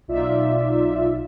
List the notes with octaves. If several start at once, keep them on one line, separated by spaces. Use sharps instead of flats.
B1 D#4 F4 D5 E5